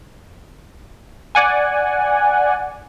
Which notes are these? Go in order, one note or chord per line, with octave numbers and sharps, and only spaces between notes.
D5 F#5 G#5